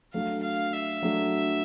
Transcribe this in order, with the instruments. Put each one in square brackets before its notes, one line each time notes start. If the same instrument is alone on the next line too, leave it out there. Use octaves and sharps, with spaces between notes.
[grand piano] F#3 A3 D4 [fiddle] F5
[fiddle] F5
E5
[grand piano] F#3 A3 D4